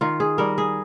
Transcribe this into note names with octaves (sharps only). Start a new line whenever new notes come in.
D#3 F4
G#4
G3 A#4
G#4